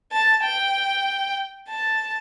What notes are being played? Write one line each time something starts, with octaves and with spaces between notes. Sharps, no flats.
A5
G5
A5